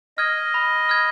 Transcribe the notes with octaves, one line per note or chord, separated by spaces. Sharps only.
D#5 F6 G#6
B5
F6 G#6